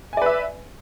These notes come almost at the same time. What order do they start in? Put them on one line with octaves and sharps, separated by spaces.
G#5 D5 B4 E5